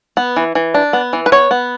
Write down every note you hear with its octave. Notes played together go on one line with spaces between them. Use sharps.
B3
E3
E3
D4
B3
E3
B4
B3 C#5
B3